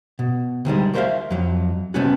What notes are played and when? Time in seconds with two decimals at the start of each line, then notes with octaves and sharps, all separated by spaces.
0.19 B2
0.65 D2 D#3 G3 G#3
0.94 F#4 A#4 C5 D5 E5 F5
1.30 F2 F#3
1.94 C3 A3 B3 C#4 F#4